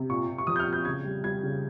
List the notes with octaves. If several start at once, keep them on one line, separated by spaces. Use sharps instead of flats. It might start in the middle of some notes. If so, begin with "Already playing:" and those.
Already playing: C3
A#2 C#6
A#2
C#6
F3 D#6
G6
F6
A#2
G6
C#3 G#6
G3
G3 G#6
C#3